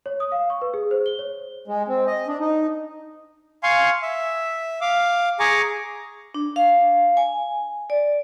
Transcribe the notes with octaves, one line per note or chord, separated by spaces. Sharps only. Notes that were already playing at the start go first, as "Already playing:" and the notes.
C#5
D#6
F5
C#6
B4
G#4
C5
G7
C#5
G#3
C4
D#5
D4
D#4
F5 G#5 C6 C#6
E5
F5 D6
G#4 G#5 A#5 C#6 D6
D4
F5
G#5
D5